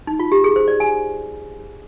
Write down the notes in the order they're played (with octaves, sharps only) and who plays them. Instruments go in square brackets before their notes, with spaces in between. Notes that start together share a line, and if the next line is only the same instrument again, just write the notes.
[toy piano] D#4
F4
G4
G#4
C5
D5
G#5